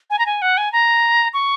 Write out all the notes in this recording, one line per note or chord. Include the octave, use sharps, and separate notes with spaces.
G#5
A#5
G#5
F#5
G#5
A#5
C#6